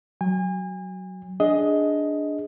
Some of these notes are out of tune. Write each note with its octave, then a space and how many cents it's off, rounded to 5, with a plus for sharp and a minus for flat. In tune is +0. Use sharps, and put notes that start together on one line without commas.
F#3 +5 G#5 -35
D4 +0 G#4 +0 D#5 +15